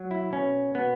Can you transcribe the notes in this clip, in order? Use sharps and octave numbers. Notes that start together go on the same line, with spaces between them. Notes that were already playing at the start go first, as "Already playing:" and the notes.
Already playing: F#3
E4
B2 C#4
B2 B3